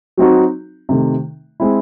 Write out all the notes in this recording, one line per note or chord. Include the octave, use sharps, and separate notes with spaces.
F#3 C4 D#4 F#4
C3 D#3 A3
G#3 C4 E4